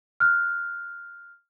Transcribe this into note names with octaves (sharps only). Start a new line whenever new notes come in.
F6 F#6